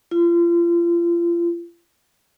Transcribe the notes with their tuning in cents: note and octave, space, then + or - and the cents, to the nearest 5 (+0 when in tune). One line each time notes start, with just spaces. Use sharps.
F4 -35